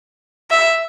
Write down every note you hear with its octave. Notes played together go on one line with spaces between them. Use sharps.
E5